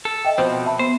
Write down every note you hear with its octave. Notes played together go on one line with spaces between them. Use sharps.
A4
D#5 E5 G5
B2 F3 C4 C5
E5 A5 B5
B3 C5